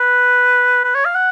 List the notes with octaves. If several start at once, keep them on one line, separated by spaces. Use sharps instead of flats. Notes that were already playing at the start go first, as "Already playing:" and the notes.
Already playing: B4
B4
C#5
F5
F#5